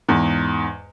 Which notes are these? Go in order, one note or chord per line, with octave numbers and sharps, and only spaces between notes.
E2 G#2